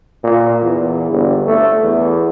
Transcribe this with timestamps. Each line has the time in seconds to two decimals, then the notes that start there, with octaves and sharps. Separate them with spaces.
0.23 A#2
0.63 E2
1.11 G1
1.46 A3
1.83 E2